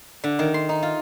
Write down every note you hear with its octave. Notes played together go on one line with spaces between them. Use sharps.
D3
D#3
C6
D#4
F4